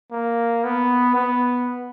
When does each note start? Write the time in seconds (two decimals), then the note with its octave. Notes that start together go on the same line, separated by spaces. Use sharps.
0.11 A#3
0.64 B3
1.15 B3